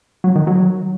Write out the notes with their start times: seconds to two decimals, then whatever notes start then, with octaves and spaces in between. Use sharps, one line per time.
0.24 F#3
0.36 D#3
0.47 F#3